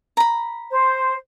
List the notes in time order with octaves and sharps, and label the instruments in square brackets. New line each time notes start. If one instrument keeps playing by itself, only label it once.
[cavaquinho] A#5 B5
[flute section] C5